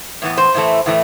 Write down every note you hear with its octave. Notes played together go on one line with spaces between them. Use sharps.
A2 E3 B3
C5
A2 E3 A3
A2 E3 A3